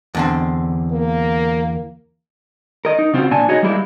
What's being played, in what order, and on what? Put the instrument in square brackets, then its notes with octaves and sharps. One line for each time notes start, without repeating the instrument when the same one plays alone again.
[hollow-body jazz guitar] E2 D3 C4
[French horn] A#3
[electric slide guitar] A#4 D#5
D#4
C#3 C4 F4 F#4
A#2 D4 G#5 A5
D#4 F#4 G#4 C#5 D#5
G3 G#3 A#3 E4 G4